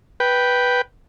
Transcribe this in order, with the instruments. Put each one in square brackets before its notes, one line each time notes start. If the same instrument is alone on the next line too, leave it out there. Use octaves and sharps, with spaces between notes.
[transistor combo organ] B4 G5